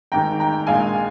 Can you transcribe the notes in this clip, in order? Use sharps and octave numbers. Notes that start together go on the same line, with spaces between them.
G#1 G#2 D#3 G5 A#5
G5 A#5
A#1 A#2 G#3 F5 G#5